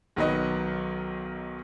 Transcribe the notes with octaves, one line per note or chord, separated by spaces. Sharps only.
B1 D#3 F#3 B4 D#5